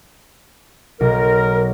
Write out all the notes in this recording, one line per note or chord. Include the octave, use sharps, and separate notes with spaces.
B1 A#4